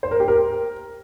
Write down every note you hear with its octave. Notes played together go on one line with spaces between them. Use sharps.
C5
A#4
G4
A#4